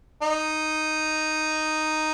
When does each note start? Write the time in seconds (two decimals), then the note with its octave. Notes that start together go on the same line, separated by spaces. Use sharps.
0.22 D#4